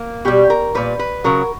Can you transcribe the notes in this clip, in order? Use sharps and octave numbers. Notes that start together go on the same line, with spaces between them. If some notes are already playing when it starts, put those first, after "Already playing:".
Already playing: A#3
B2 G3 G4
A#4
A#2 G3 B4
B4
C#3 F#3 A#4